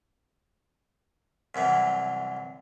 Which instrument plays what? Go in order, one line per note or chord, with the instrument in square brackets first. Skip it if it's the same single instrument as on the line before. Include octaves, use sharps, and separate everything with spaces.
[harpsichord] C2 F#2 E3 F#3